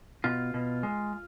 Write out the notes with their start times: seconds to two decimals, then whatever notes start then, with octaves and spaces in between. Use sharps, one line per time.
0.24 B2 F4
0.54 B2
0.83 G#3